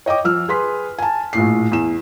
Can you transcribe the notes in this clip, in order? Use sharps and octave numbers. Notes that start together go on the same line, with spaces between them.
C#5 D#5 G5 D6
F3 E6 F6
G#4 B4 C6 B6
G#5 A5
A#1 A2 C7
E2 E7